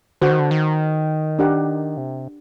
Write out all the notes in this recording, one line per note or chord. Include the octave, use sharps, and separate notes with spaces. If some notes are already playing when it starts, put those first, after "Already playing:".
D3 F#4 C5 F#5
D#3
D3
D#3
D4 G4 A#4 F#5
C3